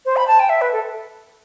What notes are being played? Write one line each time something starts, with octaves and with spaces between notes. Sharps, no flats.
C5
B5
A5
G5
E5
B4
A4